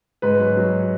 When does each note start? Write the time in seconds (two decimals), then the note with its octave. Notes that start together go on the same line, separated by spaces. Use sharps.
0.22 G#2 B4
0.40 F#3
0.57 F#3